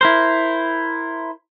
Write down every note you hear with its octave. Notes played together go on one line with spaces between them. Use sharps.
E4 A#4 C5